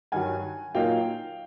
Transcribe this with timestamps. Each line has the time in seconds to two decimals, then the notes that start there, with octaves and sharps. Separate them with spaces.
0.12 G2 D#3 F#3 F#5 G#5
0.75 A#2 F#3 A#3 D#4 F5 G5